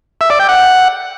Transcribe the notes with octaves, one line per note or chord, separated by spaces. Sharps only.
E5
D5
G5
F#5